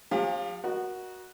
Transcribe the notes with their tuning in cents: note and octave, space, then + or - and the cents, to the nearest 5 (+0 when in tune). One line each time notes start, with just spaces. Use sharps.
F3 +40 G4 +45 F5 +5
F#4 +0 A#4 +30 D#5 -25